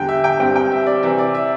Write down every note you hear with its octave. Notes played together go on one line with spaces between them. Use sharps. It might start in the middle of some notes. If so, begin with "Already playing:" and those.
Already playing: E2 D3 G3 G5
E5
G5
G2 G3 C4 G5
G5
E5
D5
C3 E3 C4 E5
D5
E5